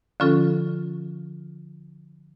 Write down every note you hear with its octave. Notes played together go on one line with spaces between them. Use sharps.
D3 F3 C#4 F4 A4